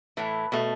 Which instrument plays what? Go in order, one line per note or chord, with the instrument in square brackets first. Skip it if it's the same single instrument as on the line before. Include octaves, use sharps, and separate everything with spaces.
[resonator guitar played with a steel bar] A2 E3 A3
B2 A3